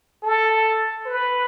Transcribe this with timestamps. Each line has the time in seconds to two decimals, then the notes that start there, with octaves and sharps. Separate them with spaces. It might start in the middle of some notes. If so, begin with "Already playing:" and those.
0.23 A4
1.06 B4